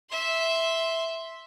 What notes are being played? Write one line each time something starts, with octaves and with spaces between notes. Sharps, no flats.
E5 C6